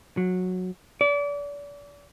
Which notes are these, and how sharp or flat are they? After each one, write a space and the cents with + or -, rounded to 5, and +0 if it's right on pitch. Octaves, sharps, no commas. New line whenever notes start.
F#3 -15
D5 -35